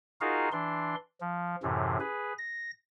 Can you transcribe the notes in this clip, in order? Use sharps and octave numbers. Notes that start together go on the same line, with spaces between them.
D#4 F4 F#4 G#4 A#4 F5
E3 D4 C6
F3
F#2 A2 C3 E3
G#4 B4
A#6